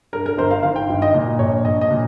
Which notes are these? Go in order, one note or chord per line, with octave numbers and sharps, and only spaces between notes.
G2 A#4
A#4
G1 C5
F5
D#3 F5
G5
G1
D#5
A#2
A#1 C#5
A#1 D#5
D#5
A#2